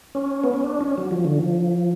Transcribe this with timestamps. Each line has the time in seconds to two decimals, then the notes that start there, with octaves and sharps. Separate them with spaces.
0.15 C#4
0.44 B3
0.54 C#4
0.64 D4
0.81 C#4
0.98 F#3
1.11 F3
1.25 D3
1.39 F3